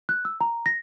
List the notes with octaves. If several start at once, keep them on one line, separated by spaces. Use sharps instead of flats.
F#6
E6
A#5
A#6